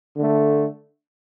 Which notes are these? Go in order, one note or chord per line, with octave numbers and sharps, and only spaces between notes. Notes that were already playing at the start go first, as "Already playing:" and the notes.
D3 A3